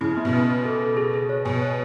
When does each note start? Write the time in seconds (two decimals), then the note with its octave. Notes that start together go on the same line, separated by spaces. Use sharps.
0.01 C#3 E4
0.17 B3
0.25 B2
0.33 B3
0.49 B3
0.65 A4
0.81 A4
0.97 G#4
1.14 G#4
1.29 C#5
1.45 B2 G#5
1.62 C#5